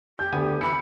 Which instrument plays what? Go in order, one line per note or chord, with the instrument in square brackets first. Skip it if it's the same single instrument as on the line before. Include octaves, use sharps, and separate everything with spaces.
[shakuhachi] G4 [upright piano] G6
[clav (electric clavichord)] D2 B3 G#5 [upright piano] D3
[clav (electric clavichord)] E3 E4 [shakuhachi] B5 [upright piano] C#7